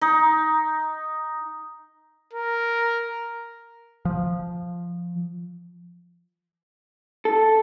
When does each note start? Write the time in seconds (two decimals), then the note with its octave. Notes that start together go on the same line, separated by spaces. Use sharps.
0.01 D#4
2.33 A#4
4.05 F3
7.25 A4